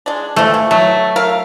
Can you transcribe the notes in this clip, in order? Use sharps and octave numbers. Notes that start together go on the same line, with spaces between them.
G#3 D4
E3 F3 A3
E3
F#3 A3
A#4 E5 F5